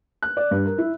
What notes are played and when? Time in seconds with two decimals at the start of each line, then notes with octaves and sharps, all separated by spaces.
0.22 F#6
0.37 D5
0.51 G2
0.66 A#4
0.78 E4